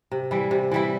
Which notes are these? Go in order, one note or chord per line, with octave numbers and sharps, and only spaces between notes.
C3
E3 G3 E4
C3
E3 G3 E4